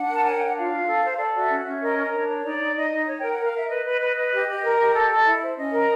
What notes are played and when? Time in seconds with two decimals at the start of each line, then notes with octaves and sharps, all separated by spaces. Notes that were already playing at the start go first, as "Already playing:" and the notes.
Already playing: D4 F#5
0.09 A#4 A5
0.24 C#5 G#5
0.34 G5
0.41 D4
0.46 F#5
0.56 F4 F5
0.72 F4
0.87 A4
1.04 C5
1.19 A4 D5
1.35 F#4 E5
1.50 C#4
1.61 C#4 E5
1.81 A#4 D#5
1.98 A#4
2.12 D4 C#5
2.28 C#5
2.43 D#4 D5
2.59 D#4
2.75 D#4 D#5
2.91 D#4
3.07 C#5
3.20 A#4 G5
3.33 F#5
3.38 A#4
3.45 F5
3.53 A#4 E5
3.68 B4 D#5
3.84 B4
4.01 B4
4.17 B4
4.32 G4
4.47 G4
4.63 A#4
4.79 G4
4.94 A4
5.10 A4
5.25 E4
5.41 C5
5.56 C#4 D#5
5.72 A#4